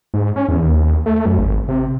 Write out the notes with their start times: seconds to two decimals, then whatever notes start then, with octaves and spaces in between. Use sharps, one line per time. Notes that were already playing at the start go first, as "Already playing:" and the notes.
0.14 G#2
0.36 C#4
0.49 E2
0.63 D#2
1.06 A3
1.26 F#2
1.38 G#1
1.68 C3